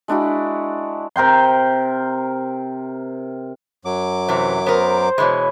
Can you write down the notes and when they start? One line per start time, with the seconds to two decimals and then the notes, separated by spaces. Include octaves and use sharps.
0.08 G#3 D4 E4 F#4
1.16 C3 A#4 G5 C6
3.85 F#2 F#3 D6
4.29 C3 E3 C5
4.66 B3 A#4 C5
5.18 B2 E3 G#3 C#5 B5